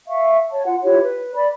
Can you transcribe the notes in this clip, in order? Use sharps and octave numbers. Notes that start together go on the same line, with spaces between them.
E5 F5 C#6
C#5 A5
F4 F#5
E4 F4 G4 C#5
B4
D5 B5